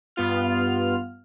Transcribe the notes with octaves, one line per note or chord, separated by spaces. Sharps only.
G2 B3 F4 F6